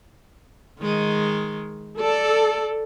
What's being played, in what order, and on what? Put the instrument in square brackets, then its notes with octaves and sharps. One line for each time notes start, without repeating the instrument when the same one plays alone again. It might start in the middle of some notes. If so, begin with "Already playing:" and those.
[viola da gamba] D#3 G#3
[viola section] A4 [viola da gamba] D5